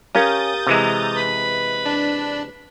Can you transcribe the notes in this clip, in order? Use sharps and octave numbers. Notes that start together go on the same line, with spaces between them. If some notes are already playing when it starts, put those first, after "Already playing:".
C#4 G4 A#4 F5 D#6 G6 A6
C3 E3 G#3 A#5
B4 B5
D4